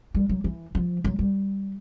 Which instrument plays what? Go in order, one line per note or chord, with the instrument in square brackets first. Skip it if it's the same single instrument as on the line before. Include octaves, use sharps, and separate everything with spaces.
[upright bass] G3
F#3
E3
F3
F#3
G3